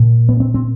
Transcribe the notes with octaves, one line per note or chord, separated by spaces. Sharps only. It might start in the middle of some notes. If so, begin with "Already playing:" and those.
Already playing: A#2
B3
C4
C4